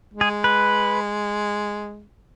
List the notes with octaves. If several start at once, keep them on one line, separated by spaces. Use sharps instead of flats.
G#3
G#4
B4